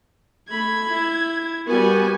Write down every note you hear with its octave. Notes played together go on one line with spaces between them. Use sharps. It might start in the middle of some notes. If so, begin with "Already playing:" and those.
A3 B5 G#6
E4
G3 B3 F#4 A#4 G#5